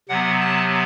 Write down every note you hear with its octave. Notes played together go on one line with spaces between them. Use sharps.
C3 F#3 B3 F#5
A5